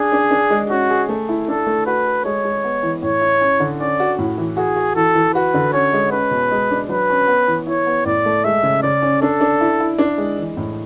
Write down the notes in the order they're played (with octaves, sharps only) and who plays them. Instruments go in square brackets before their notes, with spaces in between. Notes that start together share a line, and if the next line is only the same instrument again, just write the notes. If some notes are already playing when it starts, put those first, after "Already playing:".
Already playing: [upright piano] D4 [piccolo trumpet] G#4
[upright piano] D4
D4
G#3
[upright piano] C#4 [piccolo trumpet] F#4
[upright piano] G#4
A3
E4
[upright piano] D4 [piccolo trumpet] A4
[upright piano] A3
[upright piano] F#4 [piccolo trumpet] B4
[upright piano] A4
[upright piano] G#3 [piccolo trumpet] C#5
[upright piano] G#3
B3
E3
[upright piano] A2 [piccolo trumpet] C#5
[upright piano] E4
C#4
D3
[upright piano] C#4 [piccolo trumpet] D5
[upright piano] F#4
A2
E3
[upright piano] F#4 [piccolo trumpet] G#4
[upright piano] F#4
[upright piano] E3 [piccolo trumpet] A4
[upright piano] E3
[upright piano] F#4 [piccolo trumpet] B4
[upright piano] D3
[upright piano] C#4 [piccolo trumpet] C#5
[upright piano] G#3
[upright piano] C#4 [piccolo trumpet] B4
[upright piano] B2
G#3
D4
[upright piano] F#3 [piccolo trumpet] B4
[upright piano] C#4
B3
E3
[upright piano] E4 [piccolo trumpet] C#5
[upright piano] B3
[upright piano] A2 [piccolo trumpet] D5
[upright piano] A3
[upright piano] G#3 [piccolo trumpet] E5
[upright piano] C#3
[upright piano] C#3 [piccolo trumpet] D5
[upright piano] C#4
[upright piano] D4 [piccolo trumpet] A4
[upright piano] D4
E4
E4
D4
G#3
E3
A2